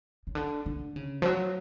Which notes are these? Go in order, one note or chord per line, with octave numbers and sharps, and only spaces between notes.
C#3
D3
D3
C#3
F3
F#3